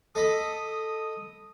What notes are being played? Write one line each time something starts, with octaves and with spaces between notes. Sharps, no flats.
A4 D#5 B5 D#6